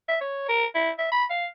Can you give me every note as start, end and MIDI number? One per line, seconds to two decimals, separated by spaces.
0.08 0.16 76
0.21 0.47 73
0.49 0.65 70
0.75 0.90 64
0.98 1.10 76
1.12 1.24 83
1.30 1.46 77